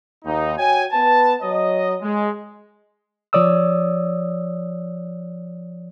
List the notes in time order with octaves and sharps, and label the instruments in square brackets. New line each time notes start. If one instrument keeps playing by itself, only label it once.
[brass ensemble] D#2 D#4
F#4 C#5 G5 G#5
B3 B4 A5
F#3 C#5 D#5
G#3
[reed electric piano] F3 C#5 D5 D#6 E6